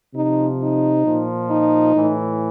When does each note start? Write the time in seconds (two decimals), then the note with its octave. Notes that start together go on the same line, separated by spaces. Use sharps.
0.15 C3 F3 D#4
0.60 D#4
1.04 A#2 F3
1.48 D#4
1.93 A2 E3